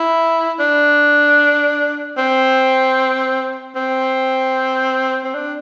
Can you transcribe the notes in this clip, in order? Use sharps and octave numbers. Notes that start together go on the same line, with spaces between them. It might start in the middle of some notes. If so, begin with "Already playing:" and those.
Already playing: E4
D4
C4
C4
C4
D4